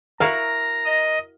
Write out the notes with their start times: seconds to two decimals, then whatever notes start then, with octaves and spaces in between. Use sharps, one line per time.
0.20 E4 F#4 A#4 F5 A#5
0.86 D#5